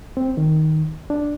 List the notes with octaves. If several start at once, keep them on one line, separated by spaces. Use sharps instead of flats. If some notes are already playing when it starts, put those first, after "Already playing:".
C4
D#3
D4